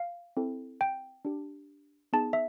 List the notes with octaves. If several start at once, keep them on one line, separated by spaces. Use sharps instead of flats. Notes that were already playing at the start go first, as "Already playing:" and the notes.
Already playing: F5
C4 E4 A4
G5
D4 G4
B3 D#4 G#4 A5
E5